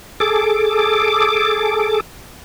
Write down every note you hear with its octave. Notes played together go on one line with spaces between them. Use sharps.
G#4 A4 D6